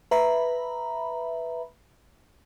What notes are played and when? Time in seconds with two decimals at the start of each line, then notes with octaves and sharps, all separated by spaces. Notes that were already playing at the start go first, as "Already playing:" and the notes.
0.11 B4 E5 A#5 B5